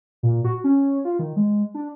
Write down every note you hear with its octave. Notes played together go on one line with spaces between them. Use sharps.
A#2
F#4
C#4
F4
D#3
G#3
D4